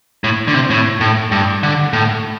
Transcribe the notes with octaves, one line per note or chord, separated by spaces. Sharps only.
A2
D3
C3
A2
A2
G2
D3
A2